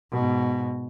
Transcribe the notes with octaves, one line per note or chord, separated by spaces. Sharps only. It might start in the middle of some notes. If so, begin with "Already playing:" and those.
G#2 B2